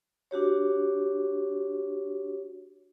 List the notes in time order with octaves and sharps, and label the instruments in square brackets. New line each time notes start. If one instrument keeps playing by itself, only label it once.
[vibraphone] D4 F#4 G4 C#5